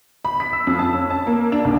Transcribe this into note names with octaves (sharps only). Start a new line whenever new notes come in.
B5
B6
E6
F2
A5
C#4
A5
A#3
D4
C2